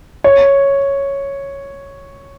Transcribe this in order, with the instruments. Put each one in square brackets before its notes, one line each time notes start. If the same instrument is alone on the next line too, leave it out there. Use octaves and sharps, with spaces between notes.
[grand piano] C#5